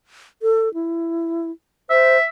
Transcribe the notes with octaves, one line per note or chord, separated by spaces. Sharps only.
A4
E4
C5 E5